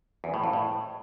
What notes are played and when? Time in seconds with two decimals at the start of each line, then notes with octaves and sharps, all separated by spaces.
0.24 E2
0.34 A2
0.44 F2
0.53 A2